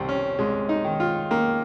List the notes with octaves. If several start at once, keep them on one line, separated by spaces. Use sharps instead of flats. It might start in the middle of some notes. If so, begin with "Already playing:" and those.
Already playing: C2 D#3 C4
C#4
C2 G#3
D#4
D#3
F4
D#3 A#3